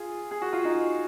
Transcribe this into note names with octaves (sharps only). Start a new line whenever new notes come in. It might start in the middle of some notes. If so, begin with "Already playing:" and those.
Already playing: F4 G#4
G#4
F#4
F4
D#4 F#4